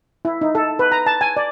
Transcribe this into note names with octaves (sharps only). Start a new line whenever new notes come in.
E4
D#4
A4
B4
A#5
A5
G#5
D5